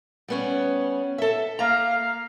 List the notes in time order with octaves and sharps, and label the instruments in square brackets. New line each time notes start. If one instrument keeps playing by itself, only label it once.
[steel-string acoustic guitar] G3 B3 C#4
A4 E5
[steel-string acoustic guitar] A#3 A#5 [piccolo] F5